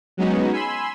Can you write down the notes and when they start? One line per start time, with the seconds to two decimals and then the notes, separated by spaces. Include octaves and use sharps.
0.17 F#3 G#3 B3 C#4 D#4 F#4
0.53 G#5 B5 C6 E6